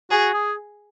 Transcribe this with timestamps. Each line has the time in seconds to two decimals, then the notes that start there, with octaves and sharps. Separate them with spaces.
0.11 F#4 G#4
0.34 G#4